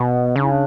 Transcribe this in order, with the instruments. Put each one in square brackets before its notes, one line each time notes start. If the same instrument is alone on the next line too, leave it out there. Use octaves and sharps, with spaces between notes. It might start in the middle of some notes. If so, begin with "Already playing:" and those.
Already playing: [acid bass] B2 [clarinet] B3
[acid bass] C#3 [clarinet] D4
[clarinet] E4
D4